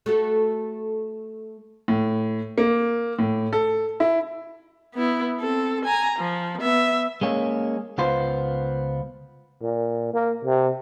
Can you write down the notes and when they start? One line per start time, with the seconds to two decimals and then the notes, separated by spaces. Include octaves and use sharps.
0.06 A3 F#4 A4
1.88 A2
2.58 A#3
3.19 A2
3.53 A4
4.00 E4
4.95 B3 E4
5.40 C4 A4
5.85 G#5 A#5
6.19 F3
6.61 B3 E5
7.21 G#3 A#3 C#4
7.98 C#2 B3 F4 C5
9.62 A#2
10.14 A#3
10.45 C3